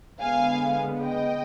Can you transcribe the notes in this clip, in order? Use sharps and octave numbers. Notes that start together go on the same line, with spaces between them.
D3 G#3 B3 F5 G#5
D#5 G5